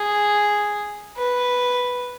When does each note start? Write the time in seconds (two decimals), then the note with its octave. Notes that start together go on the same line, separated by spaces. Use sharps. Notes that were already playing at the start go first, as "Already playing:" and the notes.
Already playing: G#4
1.17 B4